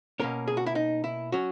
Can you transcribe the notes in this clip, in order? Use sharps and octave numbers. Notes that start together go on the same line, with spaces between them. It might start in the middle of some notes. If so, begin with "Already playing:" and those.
B2 A#3 C#4 A#4
G#4
F#4
E4
D#4
E4
F#3 C#4 F#4